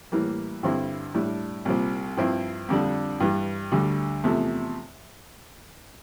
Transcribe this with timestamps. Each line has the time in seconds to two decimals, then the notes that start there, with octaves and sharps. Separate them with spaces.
0.12 A2 E3 G3 A#3
0.63 G2 D3 G3 C4 E4
1.14 A2 G3 D4
1.65 C2 A#2 G3 C4
2.17 G2 F3 C4 E4
2.69 F2 D3 G3 D4
3.20 G2 E3 G3
3.72 D2 D3 G3
4.24 E2 C3 F3 A3